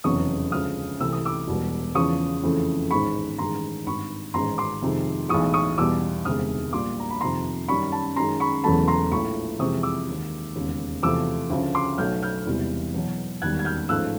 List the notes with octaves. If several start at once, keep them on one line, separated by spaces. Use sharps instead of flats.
F1 E2 C#3 F#3 C#6 D#6
D2 C#3 F3 G#3 D#6 F6
C2 C3 E3 A3 E6
D#6
D6 E6
E1 E2 B2 G3
E2 C#3 F3 C#6 D#6
F2 C#3 E3 A3
A1 G#2 D#3 G#3 B5 C#6
A1 G2 D#3 G#3 A#5 C6
G#1 G2 D#3 B5 C#6
A1 G#2 D#3 G#3 A#5 C6
C6 D6
F2 C3 D#3 G#3
B1 A2 E3 G#3 C#6 D#6
C#6 D#6
E2 B2 G3 D6 E6
E1 D2 C3 D#3 G#3 D#6 F6
A#1 A#2 G3 C6 D6
A#5
B5
F2 C3 D#3 A#5 C6
F#2 D#3 G3 B5 C#6
A5 B5
F#2 D#3 G#3 A#5 C6
B5 C#6
E1 E2 C#3 F#3 A3 A5 B5
A#5 C6
A#1 A2 F3 A3 B5 C#6
F2 C3 E3 G#3 C#6 D#6
D6 E6
D#2 D#3 G#3
E1 D#2 C#3
E2 C3 F3 A3 D6 E6
D2 C#3 F3
C6 D6
B1 B2 F#3 A3 F6 G6
F6 G6
E1 E2 C3 E3 G3
E2 B2 F#3
E1 D#2 D#3 G3 F#6 G#6
G#6
F6 G6
A1 G#2 F3 A3 E6 F#6